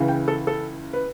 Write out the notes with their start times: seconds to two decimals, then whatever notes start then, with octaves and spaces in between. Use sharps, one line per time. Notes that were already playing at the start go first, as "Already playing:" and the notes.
Already playing: C#2 C#3 E3
0.08 G5
0.28 A4
0.47 A4
0.93 B4